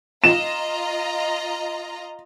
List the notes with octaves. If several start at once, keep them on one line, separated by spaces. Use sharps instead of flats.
F4 D#5 A#5 E7